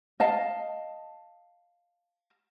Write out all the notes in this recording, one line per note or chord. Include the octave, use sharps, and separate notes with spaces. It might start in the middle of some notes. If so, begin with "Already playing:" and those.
D#5 F5 A5